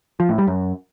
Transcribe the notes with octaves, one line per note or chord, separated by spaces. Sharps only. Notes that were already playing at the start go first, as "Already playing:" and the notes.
F3
A2
G3
F#2